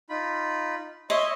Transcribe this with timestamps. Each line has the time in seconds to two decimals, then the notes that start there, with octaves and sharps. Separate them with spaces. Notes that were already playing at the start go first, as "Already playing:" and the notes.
0.09 D#4 F4 B5
1.10 C#5 D#5 E5 C6